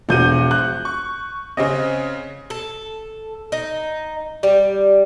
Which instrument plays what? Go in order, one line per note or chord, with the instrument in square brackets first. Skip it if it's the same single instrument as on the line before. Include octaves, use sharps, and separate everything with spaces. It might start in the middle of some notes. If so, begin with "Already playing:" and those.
[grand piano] E1 G6 D#7 [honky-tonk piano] F3 F#4
[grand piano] F#6
[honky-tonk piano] C#6
[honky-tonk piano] C#3 C4 C#4 [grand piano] D#5
[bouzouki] A4
D#4
G3